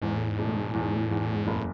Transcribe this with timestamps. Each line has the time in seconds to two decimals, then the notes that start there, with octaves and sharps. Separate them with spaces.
0.02 E2 G#2
0.16 A2
0.29 G#2
0.39 E1 A2
0.56 G#2
0.69 A2
0.74 E2
0.83 G#2
0.95 A2
1.09 E2 G#2
1.23 A2
1.35 G#2
1.47 F#1 A2